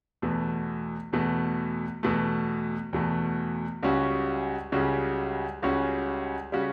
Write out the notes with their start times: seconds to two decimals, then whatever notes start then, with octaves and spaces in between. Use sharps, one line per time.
0.22 E2 B2 A3
1.13 E2 B2 A3
2.03 E2 B2 A3
2.93 E2 B2 A3
3.83 C#2 C#3 G3 C#4 F#4
4.72 C#2 C#3 G3 C#4 F#4
5.62 C#2 C#3 G3 C#4 F#4
6.52 C#3 G3 C#4 F#4